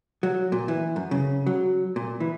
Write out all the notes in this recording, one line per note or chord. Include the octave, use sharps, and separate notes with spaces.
F#3
A#2
E3
F#2
C#3
F#3
A#2
E3